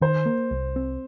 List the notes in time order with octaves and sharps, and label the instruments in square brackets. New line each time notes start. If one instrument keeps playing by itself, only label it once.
[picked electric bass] D#3 [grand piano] C5
[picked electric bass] A#3
C2
C4